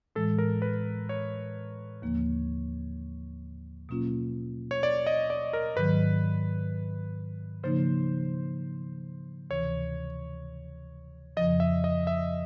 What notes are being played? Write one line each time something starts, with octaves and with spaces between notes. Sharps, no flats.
A2 E3 G#3 A4
A#4
B4
C#5
D#2 D3 F3 A#3
B2 F#3 A#3 C#4 F4
C#5
D5
D#5
D5
A#4
G#2 D#3 F#3 B4
C#3 F3 A#3 D#4 C5
D2 C3 E3 C#5
F2 C#3 F3 D#5
E5
D#5
E5